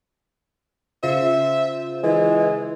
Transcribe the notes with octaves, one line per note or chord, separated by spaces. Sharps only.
C#3 F4 C5 E5
E3 G#3